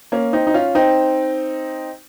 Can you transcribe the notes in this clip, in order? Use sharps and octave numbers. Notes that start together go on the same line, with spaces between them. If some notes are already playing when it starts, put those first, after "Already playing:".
A#3 C#4
C4 D#4
D#4
C#4 F4
C4 D#4